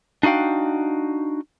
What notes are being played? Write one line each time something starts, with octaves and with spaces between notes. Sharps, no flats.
D4 D#4 F#4 F5 G5